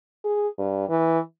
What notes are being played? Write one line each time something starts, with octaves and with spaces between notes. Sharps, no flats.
G#4
G2
E3